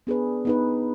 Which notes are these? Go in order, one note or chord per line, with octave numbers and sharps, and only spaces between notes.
B3 D4 G#4 B4
B3 D#4 B4